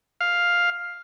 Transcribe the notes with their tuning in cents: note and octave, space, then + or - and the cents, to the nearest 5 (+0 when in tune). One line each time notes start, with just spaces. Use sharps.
F5 +5